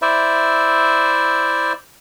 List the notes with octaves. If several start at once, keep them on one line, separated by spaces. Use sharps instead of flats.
E4 C5 D5 E5